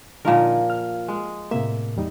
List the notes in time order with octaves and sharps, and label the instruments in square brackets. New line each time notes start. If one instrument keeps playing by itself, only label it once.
[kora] A#2 F3 A#4 [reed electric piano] D3 D#4
[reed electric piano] F6
[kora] G#3
[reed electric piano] A2 C3 A#3 [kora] E5
[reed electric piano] E2 G3 D#4